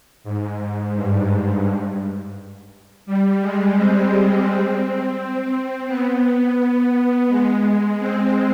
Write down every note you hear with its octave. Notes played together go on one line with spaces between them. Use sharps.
G#2
G2
G3
G#3
C4
C4
C4
B3
G#3
C4